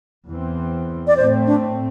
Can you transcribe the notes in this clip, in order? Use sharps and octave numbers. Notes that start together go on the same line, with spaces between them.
E2 E3 C4
D5
A2 A3 C4 C5
D4